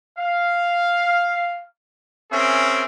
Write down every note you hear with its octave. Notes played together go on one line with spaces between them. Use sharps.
F5
C4 C#4 G#4 A#4 E5